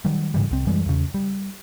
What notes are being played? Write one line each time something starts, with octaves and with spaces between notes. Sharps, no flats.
D#3 F#3 G3
G#2 C#3 E3 G3
C2 C4
F#2 E3 G3 G#3
E2 C#3
G3